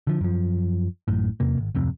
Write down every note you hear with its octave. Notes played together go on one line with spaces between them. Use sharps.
D3 F3
F#2 F3
A1 F#2 A2
E2 C3 A#3
G#1
D1 F2 C3